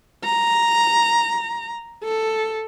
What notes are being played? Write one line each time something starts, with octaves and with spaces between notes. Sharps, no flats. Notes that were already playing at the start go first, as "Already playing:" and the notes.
A#5
A4